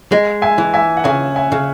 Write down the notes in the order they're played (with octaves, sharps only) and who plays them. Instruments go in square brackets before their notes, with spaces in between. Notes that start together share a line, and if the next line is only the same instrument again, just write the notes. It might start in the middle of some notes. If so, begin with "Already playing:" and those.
[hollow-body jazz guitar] G#3
[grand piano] E5 G#5
[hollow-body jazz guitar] E3
[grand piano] E5 G#5
F#5
[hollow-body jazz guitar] C#3 [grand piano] E5 G#5
[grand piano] E5 G#5
[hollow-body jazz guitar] C#3